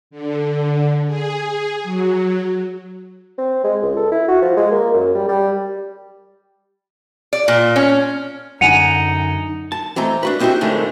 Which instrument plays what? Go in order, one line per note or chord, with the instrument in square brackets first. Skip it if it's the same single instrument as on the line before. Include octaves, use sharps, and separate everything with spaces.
[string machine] D3
G#4
F#3
[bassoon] C4
G#3
C#2
A4
E4
F#4
F3
G#3
A#3
F#2
G3
G3
[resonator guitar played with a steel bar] D5
A#2
C#4
[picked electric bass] F#2 D3 [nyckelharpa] D#4 [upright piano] F#5 G#5 [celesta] C#7 D#7 F7
[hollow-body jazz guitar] A5
E3 A3 C4 D#5 A#5
D4 F#4 B4
F#3 C4 D#4 E4 F#4 G4
F2 A2 D3 D#3 G#3 A3